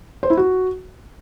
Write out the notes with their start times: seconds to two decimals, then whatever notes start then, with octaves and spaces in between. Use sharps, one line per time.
0.23 C5
0.30 E4
0.37 F#4